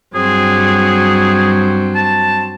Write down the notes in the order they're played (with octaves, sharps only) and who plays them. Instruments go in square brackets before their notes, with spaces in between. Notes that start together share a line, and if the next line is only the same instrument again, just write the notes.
[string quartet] G2 F#3 C4 [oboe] G#4
[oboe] A5